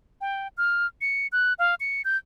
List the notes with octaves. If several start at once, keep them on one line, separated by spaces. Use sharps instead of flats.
G5
F6
C#7
F#6
F5
C#7
G6